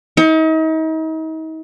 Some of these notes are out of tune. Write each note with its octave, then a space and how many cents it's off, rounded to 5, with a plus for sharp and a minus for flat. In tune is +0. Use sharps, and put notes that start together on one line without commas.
D#4 +40